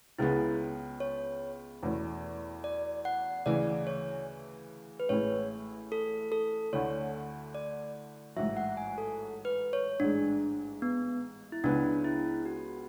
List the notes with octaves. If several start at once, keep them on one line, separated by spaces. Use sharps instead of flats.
C#2 C#3 G#3 B3 E4
C#5
E2 B2 A3 C#4 E4
D5
F#5
D2 C#3 E3 D5
C#5
B4
A1 A2 G#3 C#4 E4 C#5
A4
A4
D2 D3 A3 E4 C#5
D5
A1 G#2 F#3 E5
F#5
G#5
A4
B4
C#5
A1 G#2 G#3 D4
B3
E4
C#2 C#3 G#3 B3 D4
E4
F#4